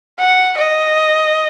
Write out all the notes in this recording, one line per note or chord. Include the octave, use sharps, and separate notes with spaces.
F#5
D#5